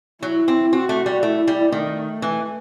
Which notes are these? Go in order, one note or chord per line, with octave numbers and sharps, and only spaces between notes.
F#3 E4
C4
C4 F#4
A3
G3
A3 E4
G3
D#3 A3
E3